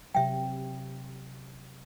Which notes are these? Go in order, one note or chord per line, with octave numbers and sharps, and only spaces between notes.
C3 F#3 E5 G5